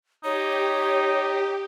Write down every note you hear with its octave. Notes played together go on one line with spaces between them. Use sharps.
D#4 G4 C#5